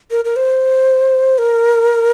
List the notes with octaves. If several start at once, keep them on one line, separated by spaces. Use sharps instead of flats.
A#4
A#4
C5
A#4